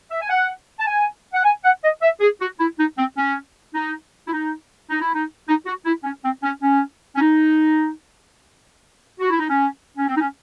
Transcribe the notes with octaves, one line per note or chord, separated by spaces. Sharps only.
E5
G#5
F#5
A5
G#5
F#5
G#5
F#5
D#5
E5
G#4
F#4
E4
D#4
C4
C#4
D#4
E4
D#4
D#4
E4
D#4
D#4
F#4
E4
C#4
C4
C#4
C#4
C#4
D#4
F#4
E4
D#4
C#4
C#4
C4
D#4
C#4